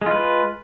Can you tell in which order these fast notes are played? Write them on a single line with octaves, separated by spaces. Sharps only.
G#3 F4 B4